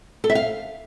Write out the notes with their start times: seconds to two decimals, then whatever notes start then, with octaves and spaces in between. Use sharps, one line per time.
0.24 A4
0.30 E5
0.35 F5